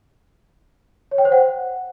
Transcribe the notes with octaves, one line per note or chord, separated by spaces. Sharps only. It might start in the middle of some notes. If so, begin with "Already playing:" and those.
C#5
G5
C5
F#5